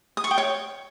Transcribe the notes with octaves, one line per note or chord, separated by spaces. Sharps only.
D#6
C#6
G5
C#5